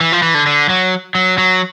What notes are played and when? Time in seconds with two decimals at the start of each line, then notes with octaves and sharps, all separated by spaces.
0.01 E3
0.12 F3
0.22 E3
0.34 D3
0.46 D3
0.69 F#3
1.15 F#3
1.38 F#3